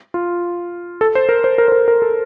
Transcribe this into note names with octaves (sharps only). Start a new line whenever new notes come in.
F4
A4
C5
A#4
C5
A#4
C5
A#4
A#4
A4